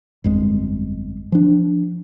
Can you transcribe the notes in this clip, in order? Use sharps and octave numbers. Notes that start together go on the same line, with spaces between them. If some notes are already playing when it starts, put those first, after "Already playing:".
G1 F2 G#3
F3 D4